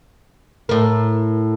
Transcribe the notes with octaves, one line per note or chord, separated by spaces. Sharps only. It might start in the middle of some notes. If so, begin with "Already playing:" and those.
A2 A#4